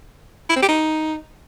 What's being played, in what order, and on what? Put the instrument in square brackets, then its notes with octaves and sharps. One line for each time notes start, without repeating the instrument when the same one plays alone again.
[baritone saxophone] E4
C4
G4
D#4